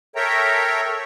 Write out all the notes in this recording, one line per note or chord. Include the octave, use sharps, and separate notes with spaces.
A4 A#4 C#5 E5 G5 A#5